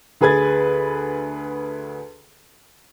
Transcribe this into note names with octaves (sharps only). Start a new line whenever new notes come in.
D2 G#4 B4 G#6 A6